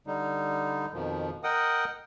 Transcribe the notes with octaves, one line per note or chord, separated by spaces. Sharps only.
D3 G3 D#4
F2 B2 D#3 F3
A#4 D#5 F#5 G5 D#6